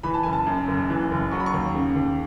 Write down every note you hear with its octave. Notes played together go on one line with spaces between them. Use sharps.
E3 B5
A5
F#1 G#5
A5
F#2
F#1
E3
F#1
F#3 C#6
B5
C#6
D#2
C#3
D#2